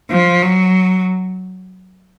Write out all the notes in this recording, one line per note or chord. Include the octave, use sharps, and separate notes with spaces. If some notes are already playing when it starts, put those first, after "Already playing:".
F3
F#3